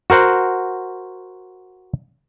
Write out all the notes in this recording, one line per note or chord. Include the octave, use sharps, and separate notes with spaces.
F#4 A#4 C5 F#5